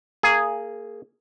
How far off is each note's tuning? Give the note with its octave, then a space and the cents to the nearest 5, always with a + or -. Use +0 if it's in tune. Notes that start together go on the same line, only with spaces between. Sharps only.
A#3 -20 G#4 +0